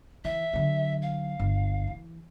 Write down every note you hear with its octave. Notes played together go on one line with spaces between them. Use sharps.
E3 E5
D3 F#3
F5
G1
E3